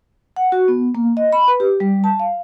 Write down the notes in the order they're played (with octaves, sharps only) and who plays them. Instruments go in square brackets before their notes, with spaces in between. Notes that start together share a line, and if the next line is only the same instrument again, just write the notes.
[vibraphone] F#5
F#4
B3
A#3
D#5
B5
B4
G4
G3
A5
F5